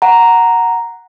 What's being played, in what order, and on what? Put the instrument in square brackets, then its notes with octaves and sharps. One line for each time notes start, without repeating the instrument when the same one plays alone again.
[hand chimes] F#5 A#5